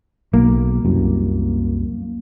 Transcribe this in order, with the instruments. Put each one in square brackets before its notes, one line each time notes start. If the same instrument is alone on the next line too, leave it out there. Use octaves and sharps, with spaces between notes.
[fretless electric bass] B1 [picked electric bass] A#3
[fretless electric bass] C2 F#2